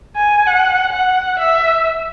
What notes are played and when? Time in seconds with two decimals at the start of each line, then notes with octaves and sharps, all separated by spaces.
0.16 G#5
0.47 F#5
0.92 F#5
1.39 E5